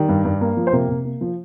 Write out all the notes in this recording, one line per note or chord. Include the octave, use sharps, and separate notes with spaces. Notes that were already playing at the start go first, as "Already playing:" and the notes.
Already playing: D#3 G3
G2
G2
A#3
F3
C5
C3 A#3 A#4
C3
A#3
F3